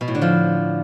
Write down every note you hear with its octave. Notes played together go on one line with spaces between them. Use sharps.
B2
A2
D3
F3